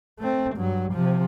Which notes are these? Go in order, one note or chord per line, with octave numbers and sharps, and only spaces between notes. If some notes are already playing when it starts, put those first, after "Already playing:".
A3 C4
G2 F#3
C3 F3